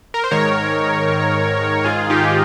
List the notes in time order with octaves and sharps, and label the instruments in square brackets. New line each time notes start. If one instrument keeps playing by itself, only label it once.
[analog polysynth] A#4
C5
G#2 D#3 A#4 C#5
G#2 D#3
G#2 D#3 F4 G#4
D#4 G4